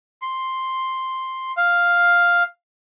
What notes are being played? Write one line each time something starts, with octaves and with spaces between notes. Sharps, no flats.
C6
F5